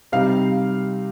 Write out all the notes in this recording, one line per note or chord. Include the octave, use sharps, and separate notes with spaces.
C3 G3 C4 D#4 F5